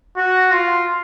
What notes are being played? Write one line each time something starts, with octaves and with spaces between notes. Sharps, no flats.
F#4
F4